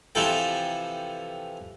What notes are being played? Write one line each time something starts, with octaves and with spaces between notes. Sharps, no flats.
C3 E3 F3 E4 A4 G5